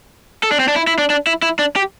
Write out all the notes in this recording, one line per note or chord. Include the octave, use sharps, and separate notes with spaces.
A4
D4
C4
D4
E4
E4
D4
D4
E4
E4
D4
G4